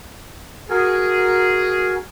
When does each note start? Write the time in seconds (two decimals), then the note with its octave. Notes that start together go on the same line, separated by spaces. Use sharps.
0.70 F#4 G#4 A#4 G#5